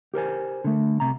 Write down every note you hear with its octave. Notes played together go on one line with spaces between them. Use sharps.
G4 A#4 C5 G#5
D3 A3
C2 C3 A#5